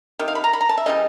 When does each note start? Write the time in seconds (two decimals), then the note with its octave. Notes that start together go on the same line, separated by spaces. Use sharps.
0.19 C3 D#3
0.28 F5
0.35 B5
0.44 A#5
0.53 B5
0.61 A#5
0.69 A5
0.78 E5
0.86 C#3 E3 G3 D#5